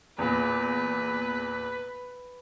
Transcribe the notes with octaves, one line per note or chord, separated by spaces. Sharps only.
E2 A#2 B4